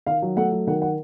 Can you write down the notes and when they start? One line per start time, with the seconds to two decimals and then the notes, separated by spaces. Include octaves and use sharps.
0.07 D#3 F5
0.22 F#3
0.36 A3 F#5
0.52 F#3
0.67 D#3 F#5
0.82 F#5